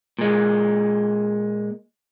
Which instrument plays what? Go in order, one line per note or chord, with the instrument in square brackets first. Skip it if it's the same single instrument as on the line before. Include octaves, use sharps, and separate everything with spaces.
[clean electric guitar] A#2 G#3